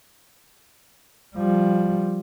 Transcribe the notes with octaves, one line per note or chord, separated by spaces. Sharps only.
F3 G3